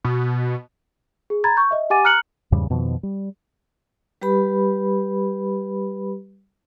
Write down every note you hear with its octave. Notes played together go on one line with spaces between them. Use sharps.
B2
G#4
A#5 B5 G#6 A6
C#6 G6
D#5 E5
G4 F#5 G#5 D6 A6 D#7
A#5 F6 F#6 C#7 F#7
E2 G#2 C#3 G3
F2 B2 D#3 F3
G3
G3 G4 B4 B5